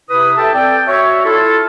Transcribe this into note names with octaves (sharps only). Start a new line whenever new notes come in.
C3 E4 B4 D#6
A4 E5 G5 A5
C4 A4 D5 G5
F#4 C#5 E5
E4 F4 A4